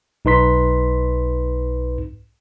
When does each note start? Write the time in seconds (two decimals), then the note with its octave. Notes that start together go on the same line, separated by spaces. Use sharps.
0.25 B1 D#4 B4 C6 B6